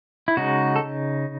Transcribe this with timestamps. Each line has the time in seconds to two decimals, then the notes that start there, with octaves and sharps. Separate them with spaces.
0.28 E4
0.37 C#3 G#3 D#4 F#4
0.76 A4